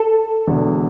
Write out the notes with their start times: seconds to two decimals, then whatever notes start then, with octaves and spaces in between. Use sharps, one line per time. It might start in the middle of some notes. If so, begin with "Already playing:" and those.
Already playing: A4
0.47 E1 E2 D3